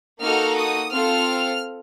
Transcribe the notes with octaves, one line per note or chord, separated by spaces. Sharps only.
A#3 D#4 F#4 A4 F6
D#6
C4 F4 A4 F6